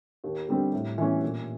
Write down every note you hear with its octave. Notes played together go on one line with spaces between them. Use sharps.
D#2
D3 G3 C4
A2
E3 A3 C#4
A#2